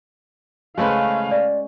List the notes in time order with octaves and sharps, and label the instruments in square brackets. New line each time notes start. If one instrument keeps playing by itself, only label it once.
[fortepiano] C#3 A3 B4 [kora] G#3 C#4 C5 [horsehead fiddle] F5
[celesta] D5